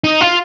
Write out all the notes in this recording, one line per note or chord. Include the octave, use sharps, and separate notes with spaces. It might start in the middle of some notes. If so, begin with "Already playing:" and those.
D#4
F4